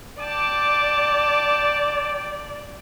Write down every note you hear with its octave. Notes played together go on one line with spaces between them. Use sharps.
D5 G5 A5 D6